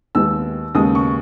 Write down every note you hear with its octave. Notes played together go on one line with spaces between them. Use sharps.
D#2 D#3 G#3 B3 E6
D#2 C#3 G#3 B3 D#6
C#6